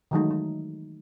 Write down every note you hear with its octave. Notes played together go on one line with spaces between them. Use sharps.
D#3 E3 F#3 G#3 A3 D#4
D#4